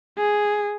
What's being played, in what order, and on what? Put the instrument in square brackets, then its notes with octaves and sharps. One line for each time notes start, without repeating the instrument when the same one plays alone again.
[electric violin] G#4